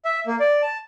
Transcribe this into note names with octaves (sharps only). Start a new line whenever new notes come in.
E5
A#3
D5
A5